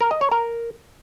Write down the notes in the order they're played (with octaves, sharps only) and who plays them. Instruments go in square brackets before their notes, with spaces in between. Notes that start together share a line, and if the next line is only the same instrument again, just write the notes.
[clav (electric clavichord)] A#4
D#5
C#5
A#4